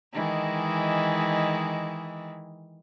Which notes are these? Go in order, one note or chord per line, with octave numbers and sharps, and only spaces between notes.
D#3 E3 G#3